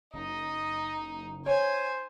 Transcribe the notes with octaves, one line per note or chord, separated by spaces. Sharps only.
F#1 D#4 D#5
C5 C#5 G#5